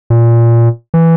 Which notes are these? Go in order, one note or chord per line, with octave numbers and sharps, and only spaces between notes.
A#2
E3